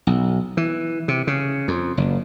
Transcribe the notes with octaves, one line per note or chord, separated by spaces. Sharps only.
B1
E3
C3
C#3
F2
F#1